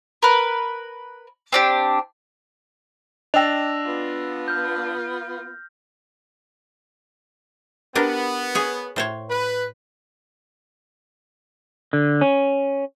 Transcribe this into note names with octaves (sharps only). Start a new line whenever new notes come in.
A#4 B4
C4 D4 G4
D4 D#5 G5 E6 A#6 F7
B3 F4
F6 G6
B3 D4 G4 A#4
G#4 C#5
A2 C5 C#5
B4
D3
C#4